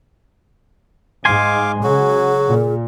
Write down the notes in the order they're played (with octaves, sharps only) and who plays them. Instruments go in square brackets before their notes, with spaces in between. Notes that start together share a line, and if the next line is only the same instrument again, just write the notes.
[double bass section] G#2 G#3 [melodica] F5 D6 [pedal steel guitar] G#5 C6
[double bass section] C#3 [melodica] F#3 F#4 [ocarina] G#4
[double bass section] A#2